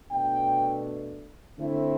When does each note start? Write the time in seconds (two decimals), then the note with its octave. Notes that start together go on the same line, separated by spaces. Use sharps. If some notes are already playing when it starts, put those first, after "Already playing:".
0.11 B2 A3 D4 G5
1.57 D3 A3 C4 E4